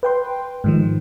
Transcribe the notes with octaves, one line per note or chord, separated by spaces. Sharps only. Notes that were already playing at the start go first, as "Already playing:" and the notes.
B4 G5 C6
G#2 D#3 F3